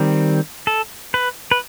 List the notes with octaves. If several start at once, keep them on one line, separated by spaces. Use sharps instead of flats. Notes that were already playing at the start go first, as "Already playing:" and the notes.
Already playing: D#3 G3 C4
A4
B4
B4